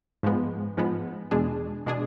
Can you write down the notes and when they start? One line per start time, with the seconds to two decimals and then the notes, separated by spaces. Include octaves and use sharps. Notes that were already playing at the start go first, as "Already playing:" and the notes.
0.23 G#2 F3 G#3 B3
0.77 G#2 F3 G#3 B3
1.31 E2 B2 G#3 D4 G#4
1.86 B2 G#3 D4 G#4